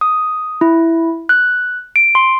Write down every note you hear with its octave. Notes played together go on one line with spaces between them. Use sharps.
D#6
E4
F#6
D7
C6